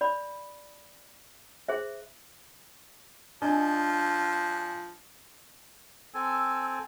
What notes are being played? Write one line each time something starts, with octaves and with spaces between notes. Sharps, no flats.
D5 B5
G#4 C5 E5
F3 D4 D#5 G#5
C4 A4 G#5 E6